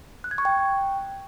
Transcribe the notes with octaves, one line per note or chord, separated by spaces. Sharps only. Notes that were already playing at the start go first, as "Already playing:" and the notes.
F#6
G#6
C#6
G5